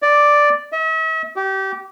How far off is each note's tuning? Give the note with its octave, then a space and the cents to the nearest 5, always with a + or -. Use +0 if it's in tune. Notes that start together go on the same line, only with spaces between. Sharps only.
D5 +0
E5 -45
G4 -25